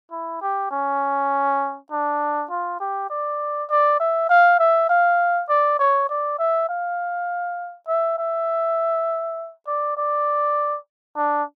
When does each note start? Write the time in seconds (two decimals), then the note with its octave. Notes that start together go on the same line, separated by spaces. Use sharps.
0.11 E4
0.41 G4
0.71 C#4
1.91 D4
2.50 F4
2.80 G4
3.10 D5
3.70 D5
4.00 E5
4.29 F5
4.59 E5
4.89 F5
5.49 D5
5.79 C#5
6.09 D5
6.39 E5
6.69 F5
7.88 E5
8.18 E5
9.67 D5
9.97 D5
11.16 D4